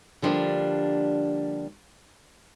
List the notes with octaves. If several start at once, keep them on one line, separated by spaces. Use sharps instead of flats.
D3 F3 G3 A#3 D4